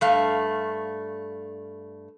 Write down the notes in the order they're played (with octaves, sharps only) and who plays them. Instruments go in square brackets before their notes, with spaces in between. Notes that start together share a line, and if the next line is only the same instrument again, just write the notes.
[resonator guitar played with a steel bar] G2 A3 F5